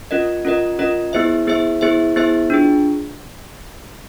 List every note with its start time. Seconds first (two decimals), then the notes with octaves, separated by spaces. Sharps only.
0.11 C#4 F4 A#4 D#5
0.45 C#4 F4 A#4 D#5
0.79 C#4 F4 A#4 D#5
1.13 B3 E4 G#4 C5 E5
1.47 B3 E4 G#4 C5 E5
1.81 B3 E4 G#4 C5 E5
2.16 B3 E4 G#4 C5 E5
2.50 D4 F4 G#4